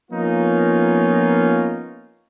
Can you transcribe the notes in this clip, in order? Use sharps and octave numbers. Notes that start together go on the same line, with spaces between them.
F3 A#3 B3 C#4 D#4 F4